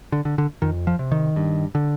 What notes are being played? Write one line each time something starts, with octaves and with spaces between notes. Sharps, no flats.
D3
D3
D3
F2 D#3
F3
C3
D#3
G2
D3